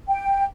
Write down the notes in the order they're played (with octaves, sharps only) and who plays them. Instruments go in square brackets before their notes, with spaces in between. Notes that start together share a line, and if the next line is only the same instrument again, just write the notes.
[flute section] G5